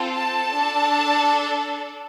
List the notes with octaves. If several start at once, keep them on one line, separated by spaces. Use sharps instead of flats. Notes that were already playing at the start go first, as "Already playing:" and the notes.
Already playing: C4 F4 A4
A5
D4 A4